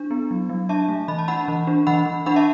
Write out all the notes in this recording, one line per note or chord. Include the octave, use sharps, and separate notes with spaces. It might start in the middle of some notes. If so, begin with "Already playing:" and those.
Already playing: D4
B3
F#3
F#3
D4 E5 A5
A3
E3 B5
A5
D4 F#5 B5
E3
D4
E3 F#5 B5
E3
D4 F#5 B5
E5 A5